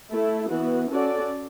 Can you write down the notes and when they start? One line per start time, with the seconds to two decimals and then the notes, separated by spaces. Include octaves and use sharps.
0.11 A3 E4 A4
0.49 E3 B3 F#4
0.90 C#4 F#4 A4 D5